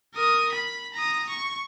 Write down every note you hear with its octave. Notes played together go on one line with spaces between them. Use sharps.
A#4 D#6
B5
A#5 D#6
C#6